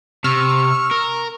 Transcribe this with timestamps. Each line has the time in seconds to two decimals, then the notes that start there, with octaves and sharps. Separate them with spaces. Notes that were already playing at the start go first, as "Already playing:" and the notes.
0.24 C3 C#6 E6 F6
0.91 A#4